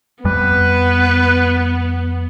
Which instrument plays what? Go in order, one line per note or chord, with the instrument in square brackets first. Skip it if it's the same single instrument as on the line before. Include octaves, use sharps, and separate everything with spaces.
[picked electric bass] F2 G3 [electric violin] B3 [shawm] B4